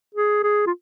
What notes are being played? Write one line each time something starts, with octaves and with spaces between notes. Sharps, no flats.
G#4
G#4
F4